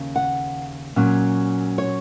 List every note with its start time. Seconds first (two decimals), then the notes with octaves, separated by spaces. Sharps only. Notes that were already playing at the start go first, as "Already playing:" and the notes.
Already playing: D#2 C#3
0.16 F#5
0.96 A#2 F#3 C#4
1.78 C#5